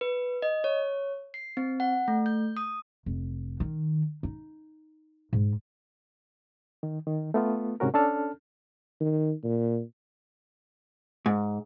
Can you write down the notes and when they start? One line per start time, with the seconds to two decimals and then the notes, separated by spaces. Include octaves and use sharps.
0.01 B4
0.42 D#5
0.64 C#5
1.34 C7
1.57 C4
1.80 F#5
2.08 A3
2.26 G6
2.57 D#6
3.06 F1
3.60 D#3
4.23 D#4
5.33 G#2
6.83 D#3
7.07 D#3
7.34 A3 B3 F4
7.80 G#2 C3 C#4 F#4 A#4
7.94 C#4 D4 A4 A5 F6
9.00 D#3
9.44 A#2
11.26 G#2